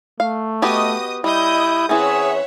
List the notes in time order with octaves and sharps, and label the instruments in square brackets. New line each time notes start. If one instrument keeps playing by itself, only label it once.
[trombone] A3 [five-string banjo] F5
[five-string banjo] B3 F#4 G4 [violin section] D#5 D#6
[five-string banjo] G3 [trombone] E4 [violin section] D#5 D#6 G6
[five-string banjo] E3 C4 C#4 [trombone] G#4 [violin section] C#5 E5 F#5